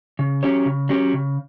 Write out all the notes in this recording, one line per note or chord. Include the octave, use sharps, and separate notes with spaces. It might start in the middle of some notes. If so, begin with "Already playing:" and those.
C#3
F#3 C#4 G4 C#5
C#3
F#3 C#4 G4 C#5
C#3